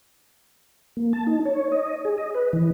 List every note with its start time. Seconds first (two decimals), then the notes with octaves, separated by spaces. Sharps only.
0.97 A#3
1.13 A5
1.27 D#4
1.45 C#5
1.72 D#5
2.05 G#4
2.18 D#5
2.35 B4
2.53 E3